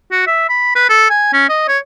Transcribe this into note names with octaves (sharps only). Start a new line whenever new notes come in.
F#4
E5
B5
B4
A4
G#5
C#4
D#5
C#5